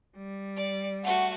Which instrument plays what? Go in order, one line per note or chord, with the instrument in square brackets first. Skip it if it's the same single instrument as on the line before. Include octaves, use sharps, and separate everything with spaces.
[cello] G3
[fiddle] D5
[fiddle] A3 F#4 [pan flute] F#5